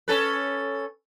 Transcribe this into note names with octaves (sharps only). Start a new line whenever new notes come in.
C#4 A4 B4